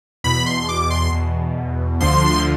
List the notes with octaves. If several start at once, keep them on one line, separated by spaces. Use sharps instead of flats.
E2 B2 B5
C6
D6
C6
E2 B2
D2 D3 F3 C6